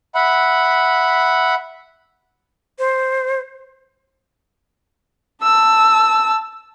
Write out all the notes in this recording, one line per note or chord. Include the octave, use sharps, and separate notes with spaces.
E5 F#5 B5
C5
A5 E6